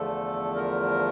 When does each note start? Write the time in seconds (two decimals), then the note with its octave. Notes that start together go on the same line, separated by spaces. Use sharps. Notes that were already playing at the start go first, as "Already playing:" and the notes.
Already playing: E2 D3 F3 A3 A4
0.55 A#4